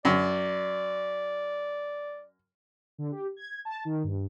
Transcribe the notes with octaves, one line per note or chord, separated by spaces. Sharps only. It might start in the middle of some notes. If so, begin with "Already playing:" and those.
F#2 D5
D3
G4
G#6
A5
D#3
G2